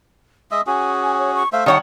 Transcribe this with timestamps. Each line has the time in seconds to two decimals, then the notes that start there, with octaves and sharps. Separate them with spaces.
0.51 G#3 D#5 E5 D#6
0.67 C#4 F#4 G#4 G#5
1.19 C#5
1.36 C#6
1.53 A3 C5 E5 F5
1.66 D#3 G3 C#5 F#5 A5